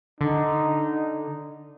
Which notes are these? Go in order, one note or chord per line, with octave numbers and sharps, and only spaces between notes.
D3 D#4